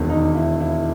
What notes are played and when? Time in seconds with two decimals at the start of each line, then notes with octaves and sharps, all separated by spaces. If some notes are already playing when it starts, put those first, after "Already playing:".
Already playing: E1 D#2 D#3
0.09 D#4
0.35 E4
0.60 E4